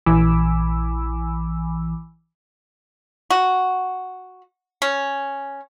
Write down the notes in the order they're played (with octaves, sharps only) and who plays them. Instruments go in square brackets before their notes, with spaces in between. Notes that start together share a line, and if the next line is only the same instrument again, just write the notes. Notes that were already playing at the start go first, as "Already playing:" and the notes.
[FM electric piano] A#1 E3 G#5 B5 D6 E6
[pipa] F#4
C#4